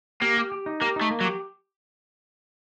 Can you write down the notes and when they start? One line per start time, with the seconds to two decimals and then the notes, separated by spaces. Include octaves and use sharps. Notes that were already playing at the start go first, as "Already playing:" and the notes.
0.22 A#3 G4
0.37 G4
0.52 G4
0.66 D#4
0.81 A#3 G4
0.96 A3 D#4
1.11 A#3
1.20 F#3
1.25 G4